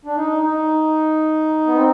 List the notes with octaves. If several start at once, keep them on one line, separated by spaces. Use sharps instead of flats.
D4
D#4
D#4
B3
C4